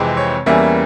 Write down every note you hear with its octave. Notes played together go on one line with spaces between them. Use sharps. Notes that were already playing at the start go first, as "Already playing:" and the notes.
Already playing: F2 C3 E3 G#3 C4
C#5
E2 E3 G3 A#3 C#4 E5